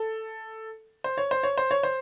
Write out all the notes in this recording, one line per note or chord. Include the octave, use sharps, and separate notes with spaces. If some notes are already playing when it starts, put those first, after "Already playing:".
Already playing: A4
C5
C#5
C5
C#5
C5
C#5
C5